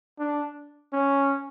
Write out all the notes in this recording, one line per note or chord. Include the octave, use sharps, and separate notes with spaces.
D4
C#4